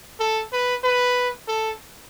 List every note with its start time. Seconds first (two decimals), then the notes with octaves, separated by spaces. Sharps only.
0.20 A4
0.53 B4
0.84 B4
1.48 A4